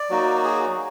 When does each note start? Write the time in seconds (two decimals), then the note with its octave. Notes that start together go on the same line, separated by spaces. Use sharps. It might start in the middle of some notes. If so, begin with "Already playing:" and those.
Already playing: D5
0.09 F#3 A#3 D#4 F#4
0.44 G#4